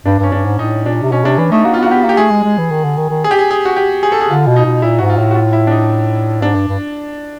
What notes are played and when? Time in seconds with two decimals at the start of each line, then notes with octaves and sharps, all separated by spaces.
0.06 G2 D4
0.19 G2
0.23 C#4
0.32 G2 D4
0.46 G#2
0.59 A2 D#4
0.86 A#2 D4
1.03 C3
1.12 B2 C#4
1.25 C3 D4
1.38 E3 D4
1.52 A3 D#4
1.65 A#3 F#4
1.74 F4
1.79 B3
1.83 F#4
1.87 A#3
1.91 B3 G4
2.04 A#3 G4
2.17 A3 G#4
2.31 G#3
2.44 G#3
2.58 E3
2.71 D#3
2.84 D3
2.97 D#3
3.10 D#3
3.24 G#4
3.31 G4
3.39 G#4
3.51 G#4
3.65 F#4
3.76 G4
4.03 G#4
4.12 A4
4.21 G#4
4.30 D3 F4
4.47 B2
4.56 D#4
4.65 B2
4.82 A#2 E4
4.99 G#2 F#4
5.10 F4
5.18 A2
5.31 F#4
5.36 F4
5.53 E4
5.67 D4
5.71 D#4
6.42 G#2 D4
6.55 G2
6.68 G2